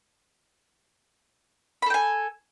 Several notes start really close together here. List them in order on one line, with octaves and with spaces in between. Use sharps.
B5 A4 G5 G#5